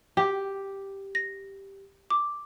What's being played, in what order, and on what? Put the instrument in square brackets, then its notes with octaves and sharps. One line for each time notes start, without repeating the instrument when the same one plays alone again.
[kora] G4
[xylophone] A#6
D6